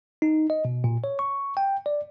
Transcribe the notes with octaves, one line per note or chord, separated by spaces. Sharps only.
D#4
D#5
B2
A#2
C#5
C#6
G5
D5